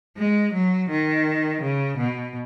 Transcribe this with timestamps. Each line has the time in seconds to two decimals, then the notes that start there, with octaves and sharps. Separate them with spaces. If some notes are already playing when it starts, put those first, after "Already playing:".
0.17 G#3
0.53 F#3
0.90 D#3
1.61 C#3
1.97 B2